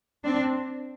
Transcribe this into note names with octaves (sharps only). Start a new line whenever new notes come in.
C4 D4